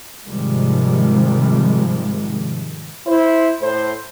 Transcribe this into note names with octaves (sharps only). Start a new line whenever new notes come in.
G#2 C3 D#3 F3 G3 G#3
E4 C5
A2 C5